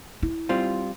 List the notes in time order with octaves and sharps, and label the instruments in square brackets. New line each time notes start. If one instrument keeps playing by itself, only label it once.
[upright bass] E4
[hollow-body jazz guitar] G3 C4 F4